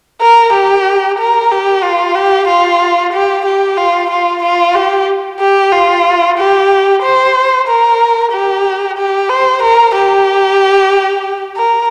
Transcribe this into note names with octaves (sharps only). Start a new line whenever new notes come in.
A#4
G4
A#4
G4
F4
G4
F4
G4
G4
F4
F4
F4
G4
G4
F4
G4
C5
A#4
G4
G4
C5
A#4
G4
A#4